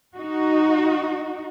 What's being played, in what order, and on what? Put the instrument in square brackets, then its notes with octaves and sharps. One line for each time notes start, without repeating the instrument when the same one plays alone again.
[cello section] D#4 F#4